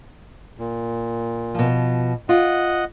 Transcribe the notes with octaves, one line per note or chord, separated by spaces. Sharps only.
A#2
B2 F3
F4 D#5 F#5